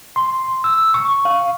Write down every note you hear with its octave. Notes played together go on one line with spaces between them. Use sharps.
C6
E6
C#6
F5